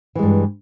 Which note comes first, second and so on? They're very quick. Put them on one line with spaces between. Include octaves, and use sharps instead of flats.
E3 G#3 G2